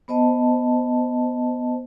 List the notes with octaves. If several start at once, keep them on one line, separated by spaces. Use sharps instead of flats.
B3 C5 D#5 A5